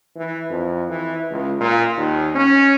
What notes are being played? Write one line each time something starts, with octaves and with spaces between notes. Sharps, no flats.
E3
F2
E3
C#2
A#2
D#2
C#4